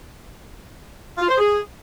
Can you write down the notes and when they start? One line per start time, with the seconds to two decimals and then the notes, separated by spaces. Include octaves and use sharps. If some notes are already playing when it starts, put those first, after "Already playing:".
1.18 F4
1.28 C5
1.38 G#4